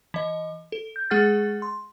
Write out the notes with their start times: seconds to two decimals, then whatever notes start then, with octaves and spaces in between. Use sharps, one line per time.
0.14 E3 D#5
0.72 A4
0.96 G6
1.10 G#3 G#4 F#5 F6 A6
1.62 C6